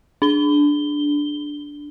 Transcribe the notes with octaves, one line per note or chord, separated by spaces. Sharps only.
D4 G7